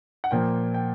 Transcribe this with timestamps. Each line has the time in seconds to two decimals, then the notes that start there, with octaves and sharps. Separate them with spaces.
0.24 F#5
0.31 A#2 F3 A#3 G5
0.74 G5